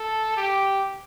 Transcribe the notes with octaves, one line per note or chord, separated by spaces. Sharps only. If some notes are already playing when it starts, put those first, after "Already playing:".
Already playing: A4
G4